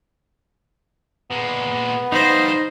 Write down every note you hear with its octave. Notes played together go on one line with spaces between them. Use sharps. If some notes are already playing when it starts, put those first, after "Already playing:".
A#2 G#3 B3
F3 G3 D#4 C5 D#5